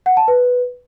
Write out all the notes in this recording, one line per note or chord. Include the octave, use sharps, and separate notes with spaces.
F#5
A5
B4